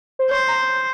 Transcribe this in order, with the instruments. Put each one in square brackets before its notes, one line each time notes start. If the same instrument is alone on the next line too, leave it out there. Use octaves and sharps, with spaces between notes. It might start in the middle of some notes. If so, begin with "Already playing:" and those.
[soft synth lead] C5
[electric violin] C5 [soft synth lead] C#5
[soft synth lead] A#5